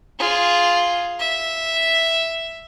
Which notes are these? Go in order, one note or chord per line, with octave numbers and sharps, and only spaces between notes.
F4 G#4
E5